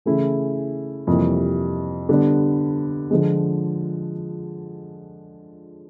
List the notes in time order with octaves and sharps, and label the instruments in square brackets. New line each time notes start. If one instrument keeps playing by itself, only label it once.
[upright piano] C#3 E3 A3 C#4 E4
F2 C3 E3 G3 A#3
D3 G3 B3 D4
D3 F3 G#3